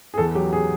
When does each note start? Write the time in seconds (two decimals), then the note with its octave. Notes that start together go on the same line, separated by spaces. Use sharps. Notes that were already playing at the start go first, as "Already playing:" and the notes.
0.14 G#4
0.18 E2 A4
0.35 F#3 G4
0.53 G#4